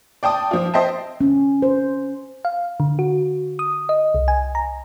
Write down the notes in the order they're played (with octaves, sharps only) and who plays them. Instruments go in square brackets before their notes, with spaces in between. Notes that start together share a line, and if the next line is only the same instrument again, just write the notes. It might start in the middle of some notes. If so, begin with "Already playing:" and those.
[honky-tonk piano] D5 G5 A5 D#6
F3 F4
C5 D#5 E5 G5 A5
[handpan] C#4
C5
[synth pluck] F5
D3
F#4
D#6
D#5
C2
G#5
A#5